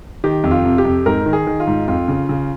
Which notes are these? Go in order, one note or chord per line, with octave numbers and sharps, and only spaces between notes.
D#3 G4
F2
F4
C3
G4
F2
G#2 A#4
D#3
G#4
D#3
F4
G#2
F2 F4
C#3
C#3